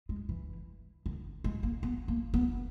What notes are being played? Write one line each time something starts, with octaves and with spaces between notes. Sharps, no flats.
G#3
E3
D#3
G#3
A#3
B3
A#3
B3